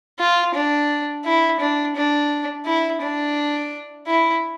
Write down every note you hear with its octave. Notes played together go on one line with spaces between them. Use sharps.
F4
D4
E4
D4
D4
E4
D4
E4